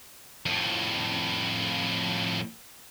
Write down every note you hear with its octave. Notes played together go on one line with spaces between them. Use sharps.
F2 A2